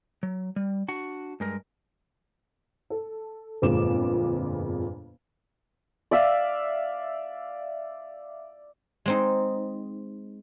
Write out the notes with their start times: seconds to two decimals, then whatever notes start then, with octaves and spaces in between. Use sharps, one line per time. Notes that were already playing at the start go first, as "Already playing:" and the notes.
0.23 F#3
0.56 G3
0.88 D4 F#4 F#5
1.40 G2 G#3 A#4
2.90 A4
3.62 G1 F2 A#2 G#3 D6 E7
6.11 D5 E5 F5
9.06 G#3 C4 D#4